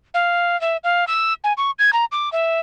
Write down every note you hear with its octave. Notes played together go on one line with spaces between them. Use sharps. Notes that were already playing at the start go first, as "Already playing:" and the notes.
F5
E5
F5
E6
G#5
C#6
G#6
A#5
D6
E5